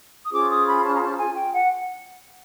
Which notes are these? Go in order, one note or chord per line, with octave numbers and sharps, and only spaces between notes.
D#6
C#4 F4 G#4 C5 D6
D#6
B5
A5
A#5
A5
G#5
G5
F#5